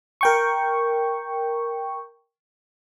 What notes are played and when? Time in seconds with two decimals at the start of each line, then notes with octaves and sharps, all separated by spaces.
0.21 A#4 G5 C#6